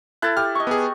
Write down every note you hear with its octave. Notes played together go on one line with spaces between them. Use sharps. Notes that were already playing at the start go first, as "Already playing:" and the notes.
E4 A4 F#6 G6 A6
G4 F6
D#5 C#6
B3 G#4